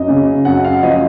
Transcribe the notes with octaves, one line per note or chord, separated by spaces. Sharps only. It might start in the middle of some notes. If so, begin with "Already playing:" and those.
Already playing: F#2 D#5
C#3
F#2 F#5
F5
F3 D#5